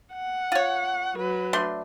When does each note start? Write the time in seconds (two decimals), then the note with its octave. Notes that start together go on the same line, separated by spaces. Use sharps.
0.13 F#5
0.52 F4 C#5
1.15 F#3 B4
1.53 A3 D4 C6